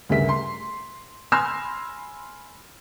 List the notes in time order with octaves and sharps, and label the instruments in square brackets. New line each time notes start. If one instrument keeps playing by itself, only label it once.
[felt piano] D2 G2 C#3 A#4 E5 B6
C6
G#5 B5 C6 E6 F6 A#6